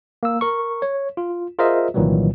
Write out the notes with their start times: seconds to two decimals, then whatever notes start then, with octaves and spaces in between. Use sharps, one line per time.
0.23 A#3 E6
0.41 A#4 C#6
0.82 C#5
1.17 F4
1.59 F4 G#4 A#4 C5 D#5 E5
1.94 C2 A#2 D#3 E3 F#3 G3